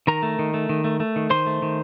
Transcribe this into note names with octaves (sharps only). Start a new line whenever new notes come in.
D#3 A#4 A#5
A3
D#3
A3
D#3
A3
A3
D#3
D#3 C5 C6
A3
D#3